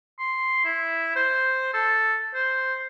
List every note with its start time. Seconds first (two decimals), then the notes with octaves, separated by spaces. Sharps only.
0.19 C6
0.65 E4
1.16 C5
1.73 A4
2.34 C5